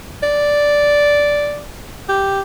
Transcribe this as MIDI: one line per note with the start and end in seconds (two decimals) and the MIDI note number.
0.23 1.62 74
2.09 2.41 67